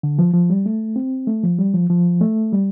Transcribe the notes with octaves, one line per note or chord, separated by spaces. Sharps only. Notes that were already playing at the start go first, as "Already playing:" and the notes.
D3
F3
F3
G3
A3
C4
A3
F3
G3
F3
F3
A3
G3